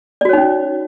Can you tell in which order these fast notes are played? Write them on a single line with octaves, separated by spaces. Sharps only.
D5 F#4 C#5 D#4 C#4